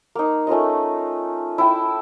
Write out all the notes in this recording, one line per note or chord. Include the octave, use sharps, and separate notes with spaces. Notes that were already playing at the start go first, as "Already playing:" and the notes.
A#3 D#4
A3 C#4 F4 D#5
E4 G5 A5